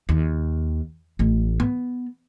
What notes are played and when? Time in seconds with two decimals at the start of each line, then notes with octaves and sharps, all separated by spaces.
0.09 D#2
1.19 A1 A2
1.60 B3